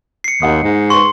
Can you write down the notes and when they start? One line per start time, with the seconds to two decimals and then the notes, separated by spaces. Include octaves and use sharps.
0.24 C7 C#7
0.42 D#2 D#5 F#5 D#6
0.63 G#2
0.90 G#4 B4 C6 C#6